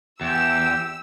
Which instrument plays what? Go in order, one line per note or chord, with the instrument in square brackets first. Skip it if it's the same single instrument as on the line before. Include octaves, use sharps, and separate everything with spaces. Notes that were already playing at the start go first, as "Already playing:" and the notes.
[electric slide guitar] E2 [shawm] G4 [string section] E6